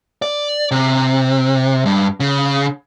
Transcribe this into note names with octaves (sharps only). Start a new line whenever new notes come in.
D5
C3
G2
C#3